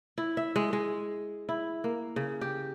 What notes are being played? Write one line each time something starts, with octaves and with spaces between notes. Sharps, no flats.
E4
E5
G#3
G#3
E4
A#3
C#3
G4